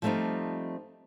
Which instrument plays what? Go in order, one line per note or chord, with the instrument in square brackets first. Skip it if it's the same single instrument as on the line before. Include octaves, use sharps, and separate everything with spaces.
[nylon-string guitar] F3 G3 A3 C4 D#4 F4